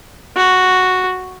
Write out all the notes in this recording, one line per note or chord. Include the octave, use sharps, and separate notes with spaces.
F#4